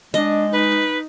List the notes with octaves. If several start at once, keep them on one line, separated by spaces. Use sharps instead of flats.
G#3 D4 D#5
D#4 B4